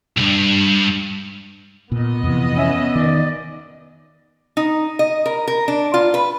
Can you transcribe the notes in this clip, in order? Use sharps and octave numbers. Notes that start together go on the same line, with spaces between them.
B1 G2
A#2 B3 D#5
F2 C3 E3
C#4 E5
D#3 D5
D#4
D#5
A#4
A#4
D4
F4
B4